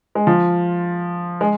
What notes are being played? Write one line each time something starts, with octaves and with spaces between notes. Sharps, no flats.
G#3
F3
G#3